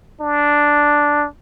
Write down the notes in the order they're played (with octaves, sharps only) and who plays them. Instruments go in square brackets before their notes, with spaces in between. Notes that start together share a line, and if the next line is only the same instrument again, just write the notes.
[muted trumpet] D4